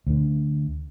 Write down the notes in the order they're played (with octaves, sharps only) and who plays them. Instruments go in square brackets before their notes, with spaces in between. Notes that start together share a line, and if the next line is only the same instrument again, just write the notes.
[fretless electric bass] D2 D3